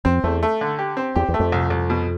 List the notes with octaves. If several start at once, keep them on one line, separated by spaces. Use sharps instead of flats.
F2 C4
E2 A3
A3
D3
G4
C4
E2 G4
E2
A3
F2
C2
C2
B2